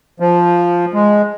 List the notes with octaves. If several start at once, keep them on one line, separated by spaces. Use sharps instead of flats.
F3
G#3